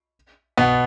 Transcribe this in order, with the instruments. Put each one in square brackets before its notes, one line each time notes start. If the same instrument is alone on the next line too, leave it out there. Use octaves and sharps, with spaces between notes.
[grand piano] B2 B3